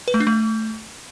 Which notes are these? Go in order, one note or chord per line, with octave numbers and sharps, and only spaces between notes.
B4
A3
D4
A3